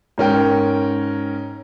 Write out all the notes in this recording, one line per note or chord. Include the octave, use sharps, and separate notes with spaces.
G#2 C#4 A#4 G5